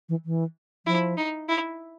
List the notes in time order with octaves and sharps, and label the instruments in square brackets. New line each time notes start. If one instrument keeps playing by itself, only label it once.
[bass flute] E3
E3
[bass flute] F3 [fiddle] E4
[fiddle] D#4
E4